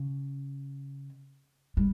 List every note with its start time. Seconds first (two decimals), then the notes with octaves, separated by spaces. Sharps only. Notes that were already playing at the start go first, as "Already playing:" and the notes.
Already playing: C#3
1.77 G3